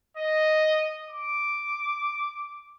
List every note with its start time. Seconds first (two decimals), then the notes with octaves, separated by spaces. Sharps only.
0.17 D#5
1.10 D6